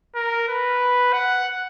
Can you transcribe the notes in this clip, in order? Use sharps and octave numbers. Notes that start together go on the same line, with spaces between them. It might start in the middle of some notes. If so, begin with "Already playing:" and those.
A#4
B4
F#5